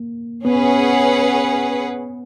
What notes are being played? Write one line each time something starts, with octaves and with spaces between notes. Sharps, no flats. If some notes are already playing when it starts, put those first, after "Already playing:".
Already playing: A#3
B3 C#4 G#4 B4 F#5